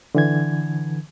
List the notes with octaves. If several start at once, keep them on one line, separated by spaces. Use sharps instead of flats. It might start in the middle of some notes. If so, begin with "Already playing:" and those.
D3 E3 G#6